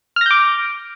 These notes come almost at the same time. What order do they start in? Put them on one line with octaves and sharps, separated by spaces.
F6 A#6 G6 D6